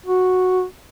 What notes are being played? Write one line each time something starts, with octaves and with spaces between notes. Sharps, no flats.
F#4